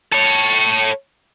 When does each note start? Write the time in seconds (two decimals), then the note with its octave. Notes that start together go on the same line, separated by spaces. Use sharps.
0.13 A4 C#5